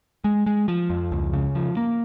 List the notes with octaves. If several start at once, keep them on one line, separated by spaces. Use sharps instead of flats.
G#3
G#3
F3
F2
C#2
C#3
F3
A#3